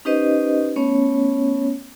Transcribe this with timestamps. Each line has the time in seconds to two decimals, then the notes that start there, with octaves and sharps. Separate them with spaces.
0.05 C#4 D#4 G4 B4 C5 D#5
0.76 A3 B3 C#4 C#5